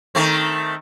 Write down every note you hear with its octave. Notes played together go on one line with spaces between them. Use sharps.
D#3 A3 C4